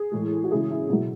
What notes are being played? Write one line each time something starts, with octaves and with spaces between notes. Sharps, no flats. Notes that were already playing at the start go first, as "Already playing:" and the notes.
Already playing: G#4
A2 E3 G#3
F#4
C#3 E3 G#3 E4 G#4
E4
B2 F#3 E4